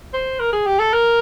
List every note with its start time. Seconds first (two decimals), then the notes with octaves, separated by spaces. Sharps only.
0.13 C5
0.39 A#4
0.53 G#4
0.66 G4
0.79 A4
0.93 A#4